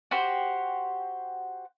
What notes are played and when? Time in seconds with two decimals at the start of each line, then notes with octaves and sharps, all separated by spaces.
0.11 F#4 G4 C5